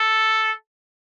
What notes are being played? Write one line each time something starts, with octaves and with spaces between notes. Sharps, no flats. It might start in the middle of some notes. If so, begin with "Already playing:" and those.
Already playing: A4